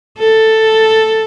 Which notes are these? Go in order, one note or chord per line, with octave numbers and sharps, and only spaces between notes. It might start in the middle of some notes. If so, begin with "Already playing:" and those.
A4